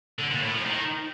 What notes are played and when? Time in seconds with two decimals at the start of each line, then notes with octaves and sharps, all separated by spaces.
0.19 D3
0.30 A#2
0.42 A2
0.54 F3
0.65 D#3